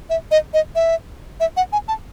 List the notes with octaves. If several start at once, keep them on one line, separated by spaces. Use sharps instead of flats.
E5
D#5
D#5
E5
E5
F#5
G#5
A5